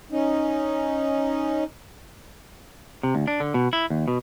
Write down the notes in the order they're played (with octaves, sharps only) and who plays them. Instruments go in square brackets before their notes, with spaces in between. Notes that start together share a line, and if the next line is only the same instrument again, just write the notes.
[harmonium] C#4 D#4
[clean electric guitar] C3
D2
D4
D3
B2
E4
D#2
B2